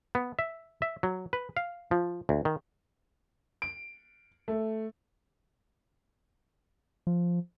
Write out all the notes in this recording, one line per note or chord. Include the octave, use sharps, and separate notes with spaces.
B3
E5
E5
F#3
B4
F5
F3
D2
D#3
D7
A3
F3